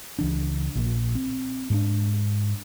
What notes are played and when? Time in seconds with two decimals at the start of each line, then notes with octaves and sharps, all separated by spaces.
0.19 C#2 E3 D4
0.75 A#1 A#2
1.15 C4
1.70 G#2 G#3 C4 D4